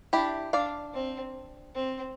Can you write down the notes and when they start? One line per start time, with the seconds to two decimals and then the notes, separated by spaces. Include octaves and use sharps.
0.13 D4 E4 G4
0.53 D4 D5 F5
0.94 C4
1.75 C4